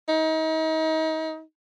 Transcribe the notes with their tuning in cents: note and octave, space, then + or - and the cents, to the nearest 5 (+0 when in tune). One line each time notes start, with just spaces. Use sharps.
D#4 +35